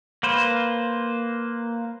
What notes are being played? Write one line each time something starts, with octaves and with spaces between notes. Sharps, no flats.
A#3 B4 C5